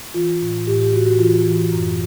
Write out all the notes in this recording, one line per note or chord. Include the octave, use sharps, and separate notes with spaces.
E3 F4
A2
A2 G4
G4
A2 F#4
F#4
E3 F4
E3
F#2